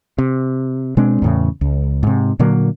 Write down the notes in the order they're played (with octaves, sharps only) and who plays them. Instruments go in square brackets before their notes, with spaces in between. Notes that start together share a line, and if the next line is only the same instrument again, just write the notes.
[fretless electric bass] C3
B2 G#3 C4 D4
E2 A2 C#3
C#2
G#2 C3
A#2 D3 F#3 A#3